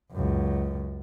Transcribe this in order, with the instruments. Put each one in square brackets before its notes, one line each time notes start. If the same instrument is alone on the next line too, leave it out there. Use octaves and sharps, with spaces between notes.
[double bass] C#2 F#2